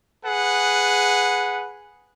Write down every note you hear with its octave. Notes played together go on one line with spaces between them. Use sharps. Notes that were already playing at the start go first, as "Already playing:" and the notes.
G#4 B4 F#5